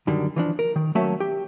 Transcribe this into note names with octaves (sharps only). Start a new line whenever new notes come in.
F#2 D3 D#3 G3
E3 F3 D4
A#4
D#3
F#3 A3 A#3 C#4 E5 A5
G4